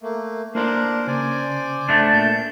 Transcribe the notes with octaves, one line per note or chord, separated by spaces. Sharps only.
A3 A#3
A#3 D4 E4 A#4 C5 D5
C#3 C5 D5 G#5
A3 D4
A#2 G6